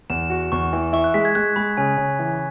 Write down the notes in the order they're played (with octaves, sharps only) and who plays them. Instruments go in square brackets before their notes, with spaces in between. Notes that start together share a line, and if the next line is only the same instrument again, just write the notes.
[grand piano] E2 [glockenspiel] E7
[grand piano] F#4
[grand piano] E2 [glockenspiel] C#6
[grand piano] E3
[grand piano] E4 [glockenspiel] C#6
[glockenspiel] F#6
[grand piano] G#3 [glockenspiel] B6
[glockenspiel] G#6
[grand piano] G#3 [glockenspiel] F#6
[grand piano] G#3 [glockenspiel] B5
[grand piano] C#3 [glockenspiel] G#5
[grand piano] C#3
E3